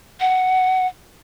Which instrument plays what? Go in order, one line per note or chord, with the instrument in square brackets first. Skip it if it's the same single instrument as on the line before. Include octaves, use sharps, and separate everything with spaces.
[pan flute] F#5